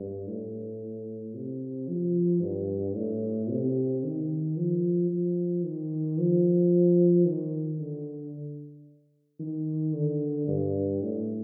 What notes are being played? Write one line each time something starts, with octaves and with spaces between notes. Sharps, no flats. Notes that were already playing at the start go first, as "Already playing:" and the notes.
Already playing: G2
A2
C3
F3
G2
A2
C3
D#3
F3
F3
D#3
F3
D#3
D3
D#3
D3
G2
A2